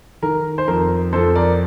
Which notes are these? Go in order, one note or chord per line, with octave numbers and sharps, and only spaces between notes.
D#3 A#4
C5
F2 A#4
F2 A4 C5
A#4 D5